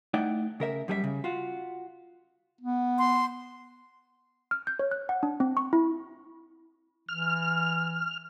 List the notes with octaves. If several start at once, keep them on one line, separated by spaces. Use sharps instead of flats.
A3 D#4 E4 D5 F#5 G5
C#3 A#4 E5
F#2 G3 G#4 E5
C#3
F4 F#4
B3
C6
F6
G6
C#5
F#6
F#5
D4
C4
C#6
E4
E3 F6